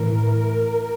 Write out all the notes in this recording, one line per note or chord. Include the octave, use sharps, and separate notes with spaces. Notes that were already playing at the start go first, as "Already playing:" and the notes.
Already playing: A2 E3 A#4